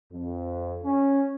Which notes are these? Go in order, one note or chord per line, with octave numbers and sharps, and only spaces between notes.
F2
C#4